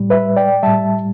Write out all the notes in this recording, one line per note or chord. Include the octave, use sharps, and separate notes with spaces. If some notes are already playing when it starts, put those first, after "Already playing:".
Already playing: A2 G3
B4 E5
D5 G5
A2 G3 E5 A5